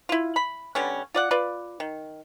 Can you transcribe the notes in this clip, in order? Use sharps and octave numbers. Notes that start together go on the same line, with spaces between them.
E4 F4
B5
D3 G3 B3 C#4
F4 D5 F#5
F4 B4 D5
D#3